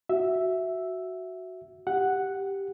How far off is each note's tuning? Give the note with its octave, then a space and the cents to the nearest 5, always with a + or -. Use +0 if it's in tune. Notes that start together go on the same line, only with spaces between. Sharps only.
F#4 +0 E5 +0
G4 +0 F#5 +0